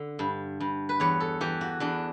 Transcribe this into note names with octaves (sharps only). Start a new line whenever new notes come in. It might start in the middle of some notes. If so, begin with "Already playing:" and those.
Already playing: D3
G2
G2
B4
E2 C#5
A4
E3 G4
F#4
E2 D4